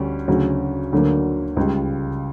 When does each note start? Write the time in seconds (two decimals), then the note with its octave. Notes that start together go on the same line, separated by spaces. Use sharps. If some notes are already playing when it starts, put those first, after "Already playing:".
Already playing: D2 D3 G3 C#4
0.28 D2 C#3 F#3
0.93 D2 D3 F#3 A#3
1.57 C#2 C#3 G3